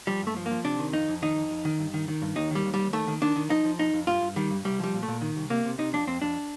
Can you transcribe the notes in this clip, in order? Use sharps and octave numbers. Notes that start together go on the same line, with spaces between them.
F3 G3
G2 A3
F3
A#3
F3
C3 D4
D#3
F2 D#4
F2
D#3 D#4
F2
F2
D#3
G2
D#3
D#3
G2
D#2 D#4
D#3 G3
D#2
G3
D#2
D#3 A3
D#3
D#3 D4
D#3
F3 D#4
F3
F2 D#4
F2
G2 F4
G2
D#3 G3
G2
C2 G3
F3 G3
A#2
A3
A#2
D#3
C2
C3 A#3
C3
C3 D#4
F2 D4
F2 C4
F2 D4